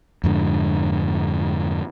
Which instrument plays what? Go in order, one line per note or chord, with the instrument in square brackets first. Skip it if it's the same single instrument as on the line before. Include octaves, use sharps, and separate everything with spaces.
[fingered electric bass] F2 G#2 D3